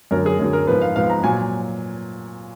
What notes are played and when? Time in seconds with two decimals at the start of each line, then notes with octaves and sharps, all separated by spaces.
0.11 F#2 D3 F#3 A#4
0.26 G#4
0.39 F#2 D3 F#3 G#4
0.53 A#4
0.67 G#2 F3 B3 B4
0.82 F5
0.96 G#2 F3 B3 F5
1.10 A#5
1.23 A#2 F#3 G#5